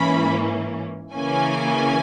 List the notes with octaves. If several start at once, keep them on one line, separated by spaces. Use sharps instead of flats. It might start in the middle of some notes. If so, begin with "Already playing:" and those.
Already playing: G#2 E3 A#3 C#4 B5
C#3 E3 A#3 C#4 G#5